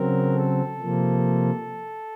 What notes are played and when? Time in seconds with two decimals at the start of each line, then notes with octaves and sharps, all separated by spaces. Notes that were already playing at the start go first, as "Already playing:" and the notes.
Already playing: C#3 F#3 C4 A#4
0.34 A4
0.80 C3 F3 A#3